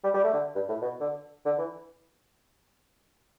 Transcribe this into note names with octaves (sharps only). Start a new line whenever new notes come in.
G3
G3
A3
D3
G2
A2
B2
D3
D3
E3